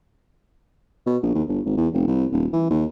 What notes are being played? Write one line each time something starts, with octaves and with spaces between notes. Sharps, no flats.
B2
A#1
D#2
G1
G#1
E2
F1
C2
D#1
E3
D#2